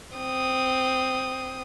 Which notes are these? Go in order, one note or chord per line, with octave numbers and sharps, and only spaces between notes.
C4 D#6